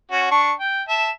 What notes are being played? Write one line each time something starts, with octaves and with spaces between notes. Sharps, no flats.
C#4 F#4
D4 C#6
G5
E5 A5